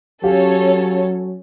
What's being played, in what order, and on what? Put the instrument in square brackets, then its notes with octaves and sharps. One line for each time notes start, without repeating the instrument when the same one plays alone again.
[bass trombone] F#3 [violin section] C#4 A4 C#5 [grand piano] G4 F5